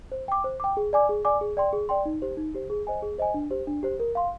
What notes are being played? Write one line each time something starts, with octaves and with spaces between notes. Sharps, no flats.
C5
G5 D6
C5
G5 D6
G#4
D5 G#5 D6
G#4
D5 G#5 D6
G#4
D5 G5 C6
G#4
D5 G5 C6
D#4
G4 C5
D#4
G4 C5
G#4
C5 D#5 G#5
G#4
C5 D#5 G#5
D4
G4 C5
D4
G4 C5
A#4
F5 C6